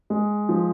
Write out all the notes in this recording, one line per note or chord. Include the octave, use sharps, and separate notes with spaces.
G#3
F3